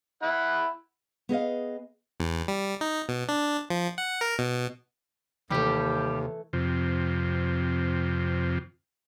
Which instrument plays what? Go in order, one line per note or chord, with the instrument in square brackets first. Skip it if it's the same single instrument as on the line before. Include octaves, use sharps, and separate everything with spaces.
[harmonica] E4 F#5 B5
[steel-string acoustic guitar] B3 G#4 D#5 F5
[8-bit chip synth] E2
G3
D#4
B2
D4
F3
F#5
A#4
B2
[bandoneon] D#2 [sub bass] C3 [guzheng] E3 A3 [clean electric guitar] G3 G4
[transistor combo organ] F2 C3